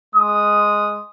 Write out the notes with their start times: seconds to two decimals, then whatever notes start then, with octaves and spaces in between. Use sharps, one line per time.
0.15 G#3 D#6